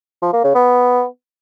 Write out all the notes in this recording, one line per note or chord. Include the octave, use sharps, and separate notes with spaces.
F3
A#3
C#3
B3